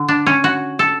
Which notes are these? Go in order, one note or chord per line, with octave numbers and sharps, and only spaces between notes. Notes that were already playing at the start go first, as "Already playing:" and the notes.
Already playing: D3
D4
C#4
F#4
A4